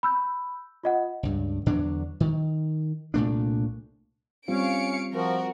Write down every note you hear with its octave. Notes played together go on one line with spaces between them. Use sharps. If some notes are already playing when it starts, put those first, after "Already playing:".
B5 E6 G6
F4 D#5 F#5
C#2 G2
E2 D3 F#3 D4
D#3
C2 A#2 A3 D4
G3 C4 C#4 F4 F5 C#7 D7
F3 F#4 A#4